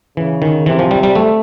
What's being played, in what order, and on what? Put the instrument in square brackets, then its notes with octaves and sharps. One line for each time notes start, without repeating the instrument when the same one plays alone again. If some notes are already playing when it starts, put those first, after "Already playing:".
[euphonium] C#3 [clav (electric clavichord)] E3
[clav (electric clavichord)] D#3
[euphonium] C3 [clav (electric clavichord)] E3
[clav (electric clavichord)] F3
G3
G3
A3